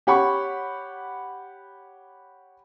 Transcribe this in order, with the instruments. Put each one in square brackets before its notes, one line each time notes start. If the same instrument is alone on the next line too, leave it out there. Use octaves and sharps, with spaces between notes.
[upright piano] G4 C#5 F#5 B5 C#6